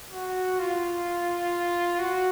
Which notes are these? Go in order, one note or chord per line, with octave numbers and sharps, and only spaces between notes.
F#4
F4
F#4